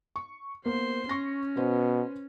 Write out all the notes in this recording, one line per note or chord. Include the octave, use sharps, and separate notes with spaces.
C#6
A#3 B3 C5 C6
C#4 C#6 A#6
B2 B4 C5